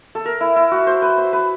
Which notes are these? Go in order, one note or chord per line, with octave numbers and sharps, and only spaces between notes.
A4
A#4
E4
E4
F#4
C5
B4
C5
B4